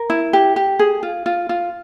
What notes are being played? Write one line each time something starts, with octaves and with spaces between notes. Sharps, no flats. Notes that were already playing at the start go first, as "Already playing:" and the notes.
Already playing: A#4
E4
G4
G4
G#4
F4
F4
F4